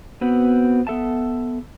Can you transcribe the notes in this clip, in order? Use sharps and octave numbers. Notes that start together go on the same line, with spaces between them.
B3 C4 F#4 B4
B3 A4 E5 A5